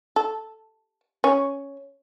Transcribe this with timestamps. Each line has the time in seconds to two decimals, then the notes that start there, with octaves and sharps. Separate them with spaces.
0.16 A4
1.24 C#4